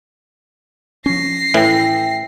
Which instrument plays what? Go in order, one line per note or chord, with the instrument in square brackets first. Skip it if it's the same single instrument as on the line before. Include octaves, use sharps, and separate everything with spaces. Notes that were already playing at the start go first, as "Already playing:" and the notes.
[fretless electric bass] F3 C#4 [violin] A#6 C7
[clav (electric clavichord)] A2 E3 [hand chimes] E5 G5